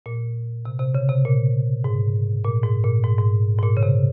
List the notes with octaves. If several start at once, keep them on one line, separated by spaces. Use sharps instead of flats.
A#2
C3
C3
C#3
C3
A#2
G#2
A#2
G#2
A#2
G#2
G#2
G#2
A#2
C#3
C3